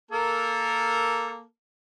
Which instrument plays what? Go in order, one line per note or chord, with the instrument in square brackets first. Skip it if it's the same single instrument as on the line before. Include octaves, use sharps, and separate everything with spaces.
[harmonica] A#3 A4 A#4